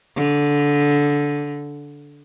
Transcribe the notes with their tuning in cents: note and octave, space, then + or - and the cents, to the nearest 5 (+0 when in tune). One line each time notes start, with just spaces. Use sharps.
D3 -15